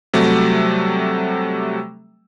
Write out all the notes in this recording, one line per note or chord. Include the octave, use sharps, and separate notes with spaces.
C3 F#3 G3 A3